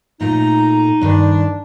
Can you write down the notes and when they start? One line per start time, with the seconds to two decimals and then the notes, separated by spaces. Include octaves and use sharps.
0.21 A#2 A3 D#4 A#5
1.01 G2 D#3 D4